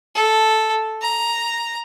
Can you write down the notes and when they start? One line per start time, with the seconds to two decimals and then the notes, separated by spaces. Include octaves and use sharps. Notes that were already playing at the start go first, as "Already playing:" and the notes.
0.15 A4
1.02 A#5